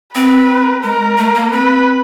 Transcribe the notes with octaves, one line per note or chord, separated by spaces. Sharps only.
C4 B4
G#3 A#4
A3
A#3
C4 B4